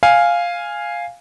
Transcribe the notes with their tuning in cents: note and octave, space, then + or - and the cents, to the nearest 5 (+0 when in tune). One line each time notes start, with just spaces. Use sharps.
F5 +0 G#5 -5